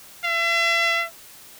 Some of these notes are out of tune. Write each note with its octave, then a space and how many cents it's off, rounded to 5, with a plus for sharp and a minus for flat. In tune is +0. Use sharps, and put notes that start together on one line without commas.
E5 +40